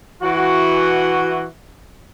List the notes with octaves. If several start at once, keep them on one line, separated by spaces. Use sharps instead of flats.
E3 F#4